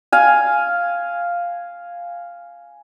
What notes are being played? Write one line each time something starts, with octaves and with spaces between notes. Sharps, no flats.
F5 G#5